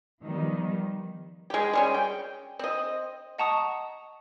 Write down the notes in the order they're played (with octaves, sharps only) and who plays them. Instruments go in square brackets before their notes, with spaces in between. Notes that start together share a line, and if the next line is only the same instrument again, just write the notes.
[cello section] D#3 F3 G3 B3
[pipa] G#3 G4
G3 G#3 C#4
G5
C4 D#5
[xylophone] D#5 F#5 A5 A#5 C#6 D#6